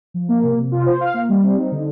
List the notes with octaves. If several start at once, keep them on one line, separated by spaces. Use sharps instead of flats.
F3
A#3
C3
C3
F4
C5
F5
A#3
G3
C4
D#4
D3